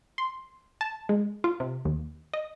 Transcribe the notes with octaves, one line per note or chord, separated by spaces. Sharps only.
C6
A5
G#3
F4
C3
D#2
D#5